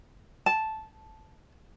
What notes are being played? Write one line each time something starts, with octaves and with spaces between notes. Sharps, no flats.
A5